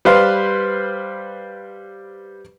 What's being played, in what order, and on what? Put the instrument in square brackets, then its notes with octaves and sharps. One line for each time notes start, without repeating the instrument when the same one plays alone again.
[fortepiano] G3 B4 C5 F5